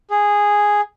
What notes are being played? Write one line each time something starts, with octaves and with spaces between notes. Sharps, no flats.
G#4